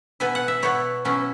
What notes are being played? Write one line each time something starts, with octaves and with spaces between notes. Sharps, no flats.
B2 B3 E4 G#5
F#5
E5
B2 B3 E4 C#5
B2 F#3 C#4 E4